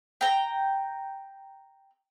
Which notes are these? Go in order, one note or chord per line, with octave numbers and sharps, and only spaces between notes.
G5 A#5